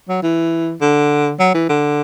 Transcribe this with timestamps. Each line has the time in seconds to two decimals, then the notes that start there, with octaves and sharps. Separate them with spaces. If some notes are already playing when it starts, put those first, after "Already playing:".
0.09 F#3
0.23 E3
0.81 D3
1.39 F#3
1.54 E3
1.69 D3